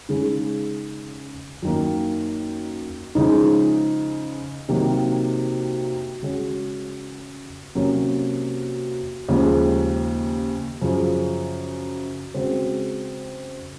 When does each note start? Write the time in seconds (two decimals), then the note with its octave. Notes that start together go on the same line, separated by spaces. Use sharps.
0.09 C#3 G#3 D#4 G#4
1.62 F#2 D#3 A#3
3.15 C#3 F3 G#3 D#4
4.69 C3 D#3 F#3 A#3
6.22 C#3 G#3 C#4 F#4
7.75 C3 F#3 A#3 C#4
9.28 D#2 C#3 F3 G#3
10.81 F#2 C#3 F3
12.34 C#3 G#3 C4 F#4